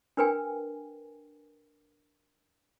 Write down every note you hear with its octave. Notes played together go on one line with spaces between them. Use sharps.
D4 A#4 B4 G5 G#5